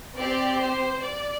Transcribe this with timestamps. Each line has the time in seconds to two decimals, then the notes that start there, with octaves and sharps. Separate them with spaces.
0.16 C4 G4 D5
0.59 C5
1.01 D5